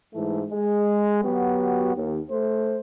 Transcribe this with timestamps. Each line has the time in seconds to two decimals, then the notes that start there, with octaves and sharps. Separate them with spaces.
0.14 G#2 E3 A3
0.50 G#3
1.23 F#3 B3 F#4 G4
1.95 D#2
2.30 A3 C5